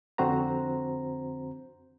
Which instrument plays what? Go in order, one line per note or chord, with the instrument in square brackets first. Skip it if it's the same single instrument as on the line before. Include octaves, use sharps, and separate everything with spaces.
[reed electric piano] F2 D3 C4 F#4 C5 A#5